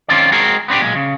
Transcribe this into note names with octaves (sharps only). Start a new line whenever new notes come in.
D#3 C4 C#4 F4 D5
G#3 C4 F#4 G#4 A#4
B3 C4 D4 G4
B1 A#2 G#3
C#3